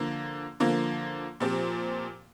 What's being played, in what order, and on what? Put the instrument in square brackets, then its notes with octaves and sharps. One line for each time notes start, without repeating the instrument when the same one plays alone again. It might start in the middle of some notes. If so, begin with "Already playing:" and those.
Already playing: [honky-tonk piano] D3 F3 A#3
D3 F3 A#3
A#2 F3 C4 G4